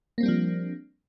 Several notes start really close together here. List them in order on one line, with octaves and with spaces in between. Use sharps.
A#3 C4 G3 D4 F3